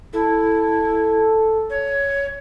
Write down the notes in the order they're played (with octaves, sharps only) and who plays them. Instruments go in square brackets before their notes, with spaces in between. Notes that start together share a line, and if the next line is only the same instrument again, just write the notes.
[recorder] E4 [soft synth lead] A4
[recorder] C#5